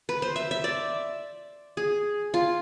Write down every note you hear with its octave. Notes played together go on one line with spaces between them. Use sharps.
B4
C5
E5
E5
D5
G#4
F4